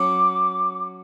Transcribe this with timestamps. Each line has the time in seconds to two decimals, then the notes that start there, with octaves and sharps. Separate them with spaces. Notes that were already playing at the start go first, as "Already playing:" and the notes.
Already playing: F#3 C#4 F#4 D6